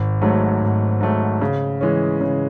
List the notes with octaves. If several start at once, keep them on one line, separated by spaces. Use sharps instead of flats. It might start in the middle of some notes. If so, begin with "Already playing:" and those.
Already playing: G#1
G#2 F#3 A3
G#1
G#2 F#3 A3
C#3
E3 G#3 C#4
C#3